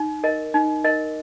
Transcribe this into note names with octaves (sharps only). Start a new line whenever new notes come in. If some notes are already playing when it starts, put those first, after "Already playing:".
Already playing: D#4
A#4 D#5
D#4
A#4 D#5